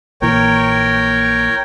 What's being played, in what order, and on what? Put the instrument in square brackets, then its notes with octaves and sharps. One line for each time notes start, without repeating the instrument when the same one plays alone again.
[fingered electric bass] A#1 A#2 E3 [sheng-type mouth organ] A#4 C#5 G5